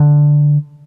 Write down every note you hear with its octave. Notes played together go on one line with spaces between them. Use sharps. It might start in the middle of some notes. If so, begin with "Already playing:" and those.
Already playing: D3